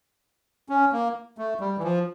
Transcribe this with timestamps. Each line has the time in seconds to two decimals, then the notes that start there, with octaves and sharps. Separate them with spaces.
0.69 C#4
0.92 A#3
1.38 A3
1.60 G3
1.78 E3
1.83 F3